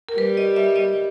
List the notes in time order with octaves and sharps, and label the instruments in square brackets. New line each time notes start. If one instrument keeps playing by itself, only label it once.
[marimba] A#4
[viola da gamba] G3 [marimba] B4
[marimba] D#5
E5
D#5